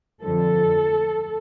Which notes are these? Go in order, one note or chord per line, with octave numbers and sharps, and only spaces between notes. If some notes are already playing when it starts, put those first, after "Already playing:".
F2 D3 F3 A4